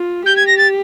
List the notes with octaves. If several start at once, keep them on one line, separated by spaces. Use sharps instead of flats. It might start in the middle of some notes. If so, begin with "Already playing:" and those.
Already playing: F4
G4 G6
G#6
A#6
A6